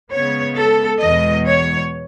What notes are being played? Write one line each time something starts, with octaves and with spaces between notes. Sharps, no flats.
C#3 G#3 B3 C#5
A4
E2 B2 G#3 D#5
C#5